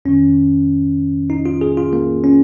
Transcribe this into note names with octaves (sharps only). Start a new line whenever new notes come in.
F2 D#3 C#4
D#4
F4
G#4
F4
A#3
C#4